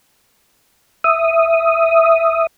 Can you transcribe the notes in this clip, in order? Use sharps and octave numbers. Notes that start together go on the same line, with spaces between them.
E5 D#6